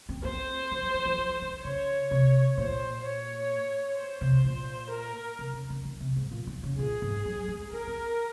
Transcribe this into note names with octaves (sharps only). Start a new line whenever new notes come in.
C4
C4 C5
F3
F#3
G#3
F3
F3
D#3
C#3 C#5
C3
A#2 C5
C#5
C5
C3
A#2
A#4
C3
C#3
C#3
D#3
C3
G#2
A#2
D#3
C#3
A#2 G#4
G#2
F#3
G#3
C4 A#4
C4